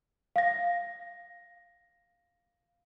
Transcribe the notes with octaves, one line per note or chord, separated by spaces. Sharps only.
F5 A#6